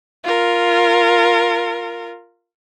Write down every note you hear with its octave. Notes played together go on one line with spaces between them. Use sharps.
F4 A#4